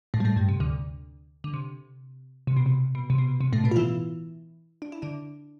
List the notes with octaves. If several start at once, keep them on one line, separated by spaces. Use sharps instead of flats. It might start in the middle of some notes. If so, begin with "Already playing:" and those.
A2 A3
G3
A2 A3
G2 G3
C3
D2 D3
D3
C3
C3
B2
C3
B2
C3
B2
C3
A2 A3
B2 B3
F4
E3 E4
D4
E4
D3 D4